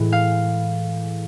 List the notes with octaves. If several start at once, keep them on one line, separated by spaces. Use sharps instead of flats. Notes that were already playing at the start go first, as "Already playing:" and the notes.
Already playing: A2 E3 G#3
F5